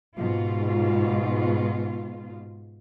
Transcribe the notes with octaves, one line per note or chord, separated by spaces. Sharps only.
G#2 B2 F4